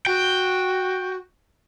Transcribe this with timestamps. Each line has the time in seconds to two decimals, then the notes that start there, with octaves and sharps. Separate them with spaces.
0.06 F#4 G5